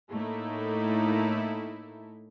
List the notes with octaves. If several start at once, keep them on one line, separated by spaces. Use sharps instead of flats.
A2 A3 A#3 D#4 E4 A4